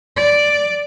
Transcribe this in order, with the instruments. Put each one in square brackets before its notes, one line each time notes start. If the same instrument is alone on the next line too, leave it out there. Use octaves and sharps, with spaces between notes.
[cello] D5